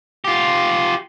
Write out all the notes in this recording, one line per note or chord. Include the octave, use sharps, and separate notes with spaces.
F4 G4